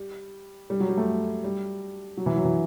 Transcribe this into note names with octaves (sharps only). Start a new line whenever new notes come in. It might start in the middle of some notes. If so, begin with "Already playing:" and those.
Already playing: G3
G3
F#3
G3
A3
G3
F#3
E3
F#3
E3